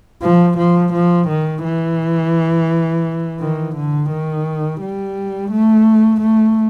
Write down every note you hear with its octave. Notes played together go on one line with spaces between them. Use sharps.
F3
F3
F3
D#3
E3
D#3
D3
D#3
G3
A3
A3